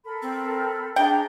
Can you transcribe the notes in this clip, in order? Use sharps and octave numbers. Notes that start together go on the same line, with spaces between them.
A4 A#4 B5
C4
D4 G#4 G5 A#5